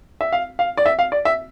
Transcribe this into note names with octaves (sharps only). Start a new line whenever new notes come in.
E5
F5
F5
D5
E5
F5
D5
E5